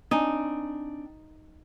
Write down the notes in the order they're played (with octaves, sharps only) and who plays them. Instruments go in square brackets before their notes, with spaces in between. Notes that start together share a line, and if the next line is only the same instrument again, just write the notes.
[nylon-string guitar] C4 D4 G#5 [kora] D#4